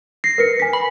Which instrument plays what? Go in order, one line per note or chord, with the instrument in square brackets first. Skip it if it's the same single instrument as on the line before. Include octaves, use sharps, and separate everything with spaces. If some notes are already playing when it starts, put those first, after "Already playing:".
[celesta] A#6 [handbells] C7
[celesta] A#4 B4 C#7
G#5 B6
[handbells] B5